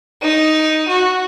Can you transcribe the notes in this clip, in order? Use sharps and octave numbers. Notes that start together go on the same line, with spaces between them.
D#4
F#4